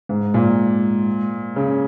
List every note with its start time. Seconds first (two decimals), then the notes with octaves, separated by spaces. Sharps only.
0.09 G#2
0.34 A#2
1.56 C#3